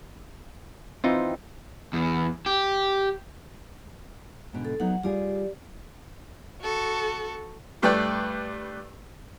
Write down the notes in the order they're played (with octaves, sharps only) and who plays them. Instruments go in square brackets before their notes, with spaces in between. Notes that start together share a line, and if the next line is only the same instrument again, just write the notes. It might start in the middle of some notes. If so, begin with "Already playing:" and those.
[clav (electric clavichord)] E3 D#4 F4 [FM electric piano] C4
[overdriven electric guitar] E2
G4
[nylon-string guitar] G#2 B2 D3
[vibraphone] A4
[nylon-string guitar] F#3 B3 D#4 [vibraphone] F#5
[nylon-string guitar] G3 F4 G#4 [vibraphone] G4 D5
[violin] F#4 A4
[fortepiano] G2 A3 B4 D5 G5